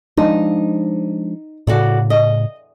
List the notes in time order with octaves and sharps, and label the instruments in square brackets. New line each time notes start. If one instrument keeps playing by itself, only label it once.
[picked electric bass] F3 G#3 D4 [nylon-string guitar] D#4
[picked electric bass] A2 C#3 [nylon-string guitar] F#4 A4 D5
[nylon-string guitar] D#5